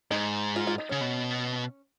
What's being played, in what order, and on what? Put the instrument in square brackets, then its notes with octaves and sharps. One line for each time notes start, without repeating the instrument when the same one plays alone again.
[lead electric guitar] G#2 [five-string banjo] D#4
[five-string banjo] F4
F4
D#4
[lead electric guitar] C#3 [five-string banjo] C#4
[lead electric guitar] B2